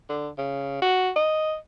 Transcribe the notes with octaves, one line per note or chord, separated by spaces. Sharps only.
D3
C#3
F#4
D#5